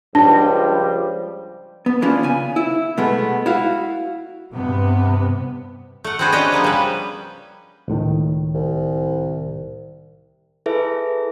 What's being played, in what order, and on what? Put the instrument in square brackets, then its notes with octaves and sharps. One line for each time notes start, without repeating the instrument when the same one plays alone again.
[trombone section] C#2 F3 G3 [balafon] D4
[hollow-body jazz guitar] B3
E3 A#3 C#4 D4 F4
C#3 G#5
E4
B2 G#3 A3 B3
E4 F#4 F5
[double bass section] G2 C3 B3
[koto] A3 F#5
C4 D4 F#4 G#4 B4 C5
C#4 D4 G4 D#5 G5
C#3 F3 A#3 B3
G3 B4
[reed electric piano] C#2 A2 D#3
[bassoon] C2
[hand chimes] E4 G#4 A4 B4 E5